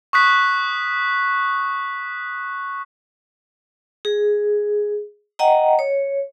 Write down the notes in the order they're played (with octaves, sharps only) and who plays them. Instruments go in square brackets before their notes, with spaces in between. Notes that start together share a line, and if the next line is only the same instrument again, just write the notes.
[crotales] C#6 D#6 F#6 B6
[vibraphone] G#4
D#5 F#5 G5 A#5
C#5